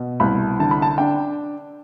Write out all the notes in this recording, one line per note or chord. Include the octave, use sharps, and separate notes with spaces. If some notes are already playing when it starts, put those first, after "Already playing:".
Already playing: B2
C2 B5
D3 A5
B5
A5
D4 G5